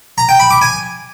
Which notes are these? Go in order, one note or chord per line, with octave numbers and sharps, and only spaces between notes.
A#5
G5
B5
D6
G#5